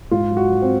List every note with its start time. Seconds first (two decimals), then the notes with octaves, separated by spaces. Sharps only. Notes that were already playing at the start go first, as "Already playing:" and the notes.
0.11 G#2 F4
0.31 F#3
0.37 F#4
0.50 F#3
0.62 C4